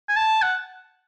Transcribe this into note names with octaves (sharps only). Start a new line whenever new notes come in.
G#5
A5
F#5